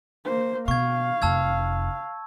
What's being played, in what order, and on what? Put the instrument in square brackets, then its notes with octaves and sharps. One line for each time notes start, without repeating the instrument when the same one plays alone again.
[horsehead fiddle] A#3 C5
[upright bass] B2 [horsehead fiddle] F5 [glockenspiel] C#6 G#6
[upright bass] F1 F2 [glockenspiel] A5 E6 G#6